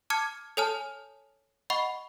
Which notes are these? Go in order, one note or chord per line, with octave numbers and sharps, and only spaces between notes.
A5 D6 F6 G#6 C#7
A4 C#5 G#5 A5 F6
D#5 F#5 B5 C#6